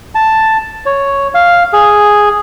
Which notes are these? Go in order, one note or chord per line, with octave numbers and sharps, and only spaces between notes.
A5
C#5
F5
G#4